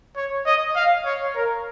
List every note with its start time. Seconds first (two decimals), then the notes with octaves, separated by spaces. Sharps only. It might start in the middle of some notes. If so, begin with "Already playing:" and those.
0.16 C#5
0.46 D#5
0.76 F5
1.05 C#5
1.35 A#4